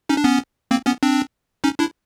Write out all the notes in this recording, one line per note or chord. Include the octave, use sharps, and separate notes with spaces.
C#4 D#4
D4
B3 C#4
A#3 C4
B3 C#4
C4 D4
C#4 D#4
D4 E4